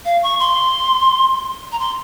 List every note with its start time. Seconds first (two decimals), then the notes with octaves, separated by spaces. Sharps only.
0.05 F5
0.23 C#6
0.40 C6
1.72 A#5
1.80 C6